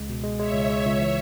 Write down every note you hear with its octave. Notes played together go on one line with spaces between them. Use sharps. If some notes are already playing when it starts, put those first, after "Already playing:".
Already playing: C#2 G#3
B2
G#3
G#3 C#5 E5
C#2
G#3
C#2
E3